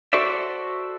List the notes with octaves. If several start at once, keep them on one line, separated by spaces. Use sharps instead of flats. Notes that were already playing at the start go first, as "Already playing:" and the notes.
F#4 A4 C5 D5 E5